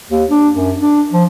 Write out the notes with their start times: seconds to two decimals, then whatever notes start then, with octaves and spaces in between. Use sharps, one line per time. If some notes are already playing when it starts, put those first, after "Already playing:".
0.10 D#2
0.31 D4
0.54 F#2
0.80 D4
1.12 F3